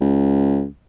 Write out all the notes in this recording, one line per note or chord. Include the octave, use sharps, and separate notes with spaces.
C#2